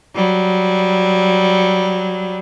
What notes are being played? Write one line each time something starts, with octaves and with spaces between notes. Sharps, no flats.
F#3 G3